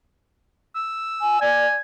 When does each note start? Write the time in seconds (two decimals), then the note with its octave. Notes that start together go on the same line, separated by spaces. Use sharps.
0.75 E6
1.21 G#5
1.41 D5 G#5